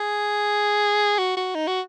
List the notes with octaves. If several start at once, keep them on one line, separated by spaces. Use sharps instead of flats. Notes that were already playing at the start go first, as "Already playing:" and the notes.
Already playing: G#4
F#4
F#4
D#4
F#4